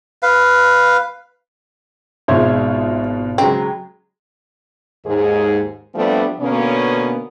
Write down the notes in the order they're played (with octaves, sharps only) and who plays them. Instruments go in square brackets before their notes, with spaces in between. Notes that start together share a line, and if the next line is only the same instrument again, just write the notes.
[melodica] B4 F5
[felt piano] G#1 [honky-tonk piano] B2 G#3 F4 [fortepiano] E4 C5 C#5
[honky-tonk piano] C#3 F#3 [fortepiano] G#3 G5 [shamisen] C4
[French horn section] D#2 G#2 G#4
F3 G3 A3 B3 C4 D4
B2 D3 A#3 B3 C#4